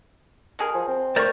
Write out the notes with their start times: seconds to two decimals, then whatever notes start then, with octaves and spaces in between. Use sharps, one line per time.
0.59 B2 G#4 A#4
0.75 F3
0.88 C4
1.16 A3 A#4 C5 D5 C#6